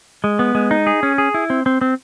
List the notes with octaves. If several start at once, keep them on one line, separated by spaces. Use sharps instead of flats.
G#3
B3
G#3
D#4
G#4
C#4
G#4
E4
C4
C4
C4